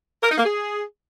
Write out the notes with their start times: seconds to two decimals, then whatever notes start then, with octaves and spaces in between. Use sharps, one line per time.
0.23 A#4
0.31 D#4
0.38 A#3
0.45 G#4